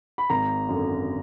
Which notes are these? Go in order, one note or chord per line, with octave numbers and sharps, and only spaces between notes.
B5
G#1 A#5
F#2 D3